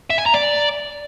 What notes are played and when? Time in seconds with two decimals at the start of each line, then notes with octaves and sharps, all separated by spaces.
0.10 E5
0.18 G#5
0.26 A#5
0.34 D5